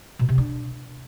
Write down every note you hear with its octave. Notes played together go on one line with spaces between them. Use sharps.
B2
C3
D4